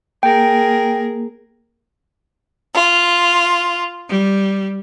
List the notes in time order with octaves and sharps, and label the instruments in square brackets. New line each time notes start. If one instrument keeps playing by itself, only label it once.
[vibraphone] A#3 [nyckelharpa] G#4 A#4 [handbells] G5
[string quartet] F4
G3